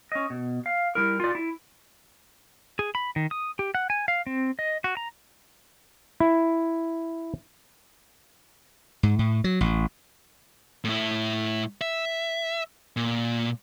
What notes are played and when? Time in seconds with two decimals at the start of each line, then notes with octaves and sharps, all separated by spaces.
0.12 C#4 D#5
0.30 B2
0.66 F5
0.95 G3 E4 A#4
1.20 F4 D5
1.35 E4
2.79 G#4
2.95 B5
3.16 D#3
3.31 D#6
3.59 G4
3.75 F#5
3.90 G#5
4.08 F5
4.27 C4
4.59 D#5
4.84 F#4
4.97 A#5
6.20 E4
9.03 G#2
9.19 A2
9.44 F#3
9.61 A1
10.84 A2 E4
11.81 E5
12.97 A#2